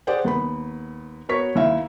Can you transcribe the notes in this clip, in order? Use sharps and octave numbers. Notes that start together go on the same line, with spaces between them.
G4 G#4 C5 D5 F#5 G5
D#2 B3 B5
B3 F#4 A#4 C#5 C#6 B6
D#2 E4 E5 F5